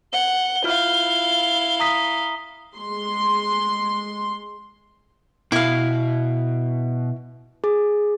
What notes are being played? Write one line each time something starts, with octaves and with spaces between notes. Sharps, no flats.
F#5 G7
E4 F4 F5 F6
A#5 D#6 B6
G#3 C6
B2 E4 F5
G#4